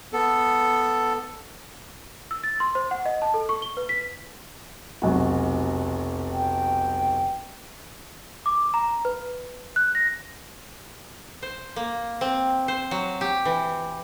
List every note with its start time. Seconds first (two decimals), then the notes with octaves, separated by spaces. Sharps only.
0.13 B3 A4
2.31 E6
2.44 A6
2.60 C6
2.75 C5
2.91 F#5
3.06 D#5
3.22 A5
3.34 A4
3.49 C#6
3.62 G7
3.77 B4
3.89 B6
5.02 F1 B1 F#4
6.32 G5
8.46 D6
8.74 A#5
9.05 B4
9.76 F#6
9.95 A#6
11.42 C5
11.76 A#3
12.21 C4
12.68 C5
12.91 F#3
13.21 G4
13.45 E3